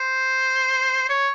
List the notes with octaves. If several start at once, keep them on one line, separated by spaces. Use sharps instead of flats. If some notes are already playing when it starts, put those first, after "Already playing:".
Already playing: C5
C#5